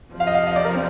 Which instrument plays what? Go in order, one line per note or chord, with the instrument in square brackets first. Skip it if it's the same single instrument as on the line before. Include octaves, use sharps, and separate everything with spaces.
[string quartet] F2 C3 F3
[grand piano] F5
D#5
F5
D#5
D5
A#4
C4